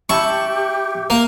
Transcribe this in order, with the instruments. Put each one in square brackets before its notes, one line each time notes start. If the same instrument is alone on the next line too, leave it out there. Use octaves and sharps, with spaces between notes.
[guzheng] E4 A5 [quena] G4 [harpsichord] C#6
[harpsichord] A#3